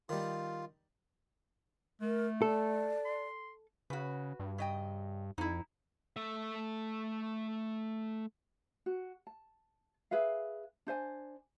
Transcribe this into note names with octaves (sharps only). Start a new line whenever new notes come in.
D#3 G3 F4
A3 A#4
A4 D5
C6
C#3 F#4 B4
G2
C#3 D#5 G5
F2 D#4 E4
A3 E5
F#4
A5
G#4 B4 E5 F5
D4 C5 E5 G#5